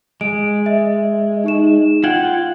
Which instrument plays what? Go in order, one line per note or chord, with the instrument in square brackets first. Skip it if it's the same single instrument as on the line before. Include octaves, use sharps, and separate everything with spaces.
[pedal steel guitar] G#3 [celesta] D7
[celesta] E5
D#4 G#4 E7
[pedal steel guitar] F4 F#5 G5 [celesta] G#6